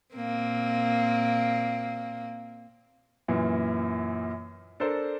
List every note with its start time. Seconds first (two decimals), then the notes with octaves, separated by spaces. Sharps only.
0.14 A#2 A#3 C4
3.28 F#2 A#2 E3
4.80 D4 A4 A#4 C5